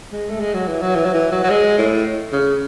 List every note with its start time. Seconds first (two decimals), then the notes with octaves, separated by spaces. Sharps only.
0.12 G#3
0.30 A3
0.40 G#3
0.54 F#3
0.68 E3
0.82 F#3
0.95 E3
1.05 F#3
1.14 E3
1.32 F#3
1.44 F#3
1.50 G#3
1.78 A2
2.33 C#3